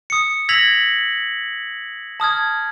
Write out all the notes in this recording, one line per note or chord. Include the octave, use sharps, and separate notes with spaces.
D#6 C#7
E6 G#6 A#6 B6 F7 F#7
A5 D#6 F6 G#6